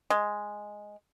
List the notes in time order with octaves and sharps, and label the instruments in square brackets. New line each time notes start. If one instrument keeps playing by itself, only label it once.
[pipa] G#3